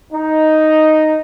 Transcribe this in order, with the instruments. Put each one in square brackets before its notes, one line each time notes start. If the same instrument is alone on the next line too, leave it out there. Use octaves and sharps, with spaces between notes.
[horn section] D#4